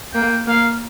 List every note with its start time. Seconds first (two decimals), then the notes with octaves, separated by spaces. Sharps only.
0.14 A#3 G5
0.47 A#3 F5